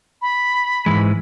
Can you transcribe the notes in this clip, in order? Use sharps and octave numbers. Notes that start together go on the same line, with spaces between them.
B5
G#2 E3 G#3